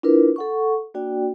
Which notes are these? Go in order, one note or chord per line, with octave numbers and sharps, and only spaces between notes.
D4 E4 F4 A#4 B4
A4 F#5 C#6
A#3 D4 F#4 D5 G5